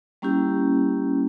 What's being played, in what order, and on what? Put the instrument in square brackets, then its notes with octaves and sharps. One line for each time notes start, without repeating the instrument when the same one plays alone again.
[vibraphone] G3 A#3 C#4 E4 G4